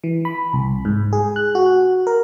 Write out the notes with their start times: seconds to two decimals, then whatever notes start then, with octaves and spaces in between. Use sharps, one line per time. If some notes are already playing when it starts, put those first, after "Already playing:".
0.04 E3
0.25 B5
0.53 C2
0.85 G#2
1.13 G#4
1.36 F#6
1.55 F#4
2.07 A#4